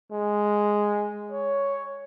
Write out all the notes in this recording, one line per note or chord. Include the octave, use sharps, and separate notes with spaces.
G#3
C#5